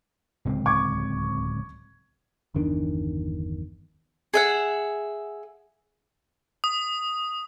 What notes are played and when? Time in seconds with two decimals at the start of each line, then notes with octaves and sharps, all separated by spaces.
0.45 D1 C#2 C4
0.66 C#6 D6 G#6
2.54 G1 E2 D#3 D4
4.34 G#4 E5 F#5
6.64 D#6